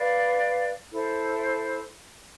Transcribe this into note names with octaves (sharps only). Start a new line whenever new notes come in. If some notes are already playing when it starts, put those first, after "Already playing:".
Already playing: B4 D5 F5
E4 A4 C5